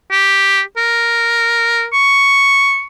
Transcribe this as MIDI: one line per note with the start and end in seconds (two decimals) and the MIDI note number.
0.11 0.61 67
0.77 1.87 70
1.93 2.85 85